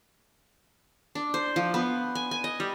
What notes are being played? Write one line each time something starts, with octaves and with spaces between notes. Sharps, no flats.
D4
C5
F3
B3
G#5
G#5
D#5
G3